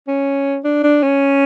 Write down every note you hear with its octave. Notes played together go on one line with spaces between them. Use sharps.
C#4
D4
D4
C#4